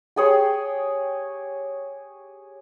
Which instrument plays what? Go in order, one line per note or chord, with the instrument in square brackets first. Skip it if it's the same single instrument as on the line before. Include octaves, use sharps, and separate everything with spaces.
[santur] G4 G#4 C#5